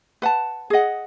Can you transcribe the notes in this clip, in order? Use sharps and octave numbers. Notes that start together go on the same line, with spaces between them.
B4 F#5 A5
G#4 D#5 F#5